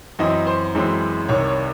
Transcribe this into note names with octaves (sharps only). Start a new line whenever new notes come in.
F#2 E3 C4 D#5
C5
F#2 E3 G#3 C4
C2 C3 D#3 C#5
C#5